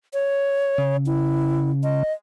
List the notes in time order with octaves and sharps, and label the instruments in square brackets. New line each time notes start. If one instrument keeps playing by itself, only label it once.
[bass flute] C#5
[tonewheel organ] C#3
[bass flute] E4
D#5